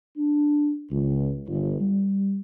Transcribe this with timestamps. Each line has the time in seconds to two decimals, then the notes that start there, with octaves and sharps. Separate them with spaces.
0.17 D4
0.91 C#2
1.47 G1
1.79 G3